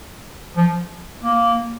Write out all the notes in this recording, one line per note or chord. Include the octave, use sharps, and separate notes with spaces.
F3
A#3